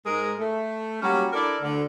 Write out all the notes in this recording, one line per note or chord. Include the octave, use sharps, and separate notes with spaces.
G#2 G#3 A#4
A3
F#3 G3 A#3 C#4 F#4 G4
D4 E4 A4 A#4 D5
D2 D3